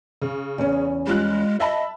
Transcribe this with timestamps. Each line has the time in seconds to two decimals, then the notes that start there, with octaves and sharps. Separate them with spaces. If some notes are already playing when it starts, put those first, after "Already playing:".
0.22 C#3
0.58 E2 C#4
1.07 G3 G#3 F4 F#6
1.60 D#5 E5 A5 B5